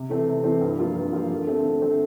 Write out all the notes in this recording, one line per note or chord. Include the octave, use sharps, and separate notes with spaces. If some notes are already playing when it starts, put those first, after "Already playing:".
Already playing: C3
E3 A3 C4
C3
E3 A3 C4
G2
F3 A#3 F4
G2
F3 A#3 F4
D3
A3 C4
D3
A3 C4